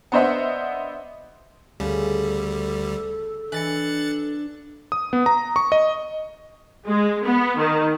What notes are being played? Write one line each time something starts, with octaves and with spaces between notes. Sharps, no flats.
B3 D4 C5 D#5 E5 F#5
D2 C#3 G3 A4
E3 D4 F#6 A6 C#7
D#6
B3
A#5
C#6
D#5
G#3
B3
D#3